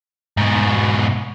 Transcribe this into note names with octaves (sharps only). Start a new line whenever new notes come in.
G#2 B2